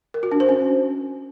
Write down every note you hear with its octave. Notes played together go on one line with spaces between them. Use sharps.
A#4
F#4
D4
C5
C#4